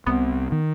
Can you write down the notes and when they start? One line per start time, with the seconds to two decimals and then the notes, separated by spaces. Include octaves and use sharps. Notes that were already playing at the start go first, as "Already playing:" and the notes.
0.07 C2 C3 B3
0.52 D#3